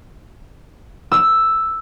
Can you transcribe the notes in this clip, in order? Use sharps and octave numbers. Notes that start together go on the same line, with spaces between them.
E6